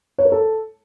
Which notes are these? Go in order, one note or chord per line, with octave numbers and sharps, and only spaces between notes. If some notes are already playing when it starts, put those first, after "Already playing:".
C#5
A#4
A4